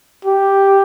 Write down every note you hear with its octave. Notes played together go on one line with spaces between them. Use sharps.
G4